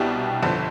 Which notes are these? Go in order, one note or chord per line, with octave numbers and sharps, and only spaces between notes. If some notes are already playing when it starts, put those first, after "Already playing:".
Already playing: C2 B2 G3 D4 G4
G1 F2 D3